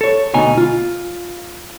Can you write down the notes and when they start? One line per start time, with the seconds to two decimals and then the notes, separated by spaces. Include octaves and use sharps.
0.01 A4 C#5
0.34 D2 B2 D#4 G#5
0.58 F4